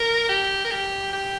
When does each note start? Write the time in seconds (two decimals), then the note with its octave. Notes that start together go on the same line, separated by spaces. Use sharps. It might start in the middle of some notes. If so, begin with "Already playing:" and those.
Already playing: A#4
0.29 G4
0.65 A#4
0.71 G4
1.13 G4